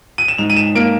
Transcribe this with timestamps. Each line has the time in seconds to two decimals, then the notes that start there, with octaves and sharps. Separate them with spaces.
0.18 D#7
0.28 E7
0.38 G#2 F7
0.50 D#7
0.57 E7
0.75 A#3 D7